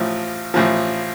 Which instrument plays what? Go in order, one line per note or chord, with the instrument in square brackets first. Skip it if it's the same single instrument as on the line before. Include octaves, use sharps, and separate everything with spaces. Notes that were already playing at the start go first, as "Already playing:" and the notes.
Already playing: [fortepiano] A1 A2 F3
A1 A2 F3